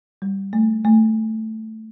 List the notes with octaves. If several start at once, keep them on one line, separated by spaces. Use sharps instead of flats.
G3
A3
A3